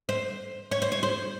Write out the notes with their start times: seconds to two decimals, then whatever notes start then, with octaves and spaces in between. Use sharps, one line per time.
0.09 C5
0.71 C#5
0.82 C5
0.92 C#5
1.03 C5